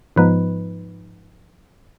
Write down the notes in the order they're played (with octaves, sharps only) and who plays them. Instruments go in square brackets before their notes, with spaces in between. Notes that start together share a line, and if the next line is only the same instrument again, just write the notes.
[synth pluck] G#2 F3 B3 D#4 B4